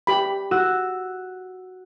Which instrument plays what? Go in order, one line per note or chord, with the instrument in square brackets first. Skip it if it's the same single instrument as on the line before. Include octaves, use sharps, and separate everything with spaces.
[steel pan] G4 G5 B5
[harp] F#4 E6